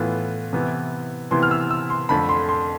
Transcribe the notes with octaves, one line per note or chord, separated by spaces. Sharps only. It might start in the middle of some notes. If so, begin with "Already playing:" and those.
Already playing: A2 E3 B3 F4
C3 E3 B3 E4
C3 E3 B3 E4 C6
F6
E6
E6
C6
F2 D3 A3 B5
C6
C6